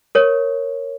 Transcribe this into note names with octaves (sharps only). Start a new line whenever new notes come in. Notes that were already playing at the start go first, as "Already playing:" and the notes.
A#4 C#5